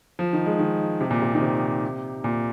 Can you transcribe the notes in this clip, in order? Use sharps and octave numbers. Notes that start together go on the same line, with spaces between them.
F3
D#3
G#3
D#3
C3
A#2
C3
D#3
C3
A#2